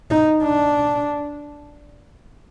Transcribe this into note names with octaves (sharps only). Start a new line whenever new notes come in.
D#4
D4